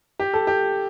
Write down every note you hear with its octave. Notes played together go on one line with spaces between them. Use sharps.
G4
A4
G4